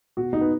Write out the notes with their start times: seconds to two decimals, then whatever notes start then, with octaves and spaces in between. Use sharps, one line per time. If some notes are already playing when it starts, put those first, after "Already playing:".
0.17 B2 F#4
0.33 D#4
0.41 B3